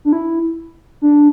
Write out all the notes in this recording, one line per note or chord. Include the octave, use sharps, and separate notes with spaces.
D4
E4
D4